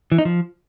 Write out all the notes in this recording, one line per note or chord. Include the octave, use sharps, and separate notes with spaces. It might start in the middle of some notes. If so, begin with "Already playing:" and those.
E3
D#4
F3